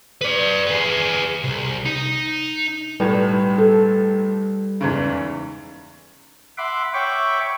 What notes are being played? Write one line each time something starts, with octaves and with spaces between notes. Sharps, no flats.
B4 D5
B3 G#4
C2
D#4
B1 A2 G3 B4
A4
E2 G#2 C#3
E5 F#5 B5 C6 D6
C#5 E5 G5 B5 C#6 D6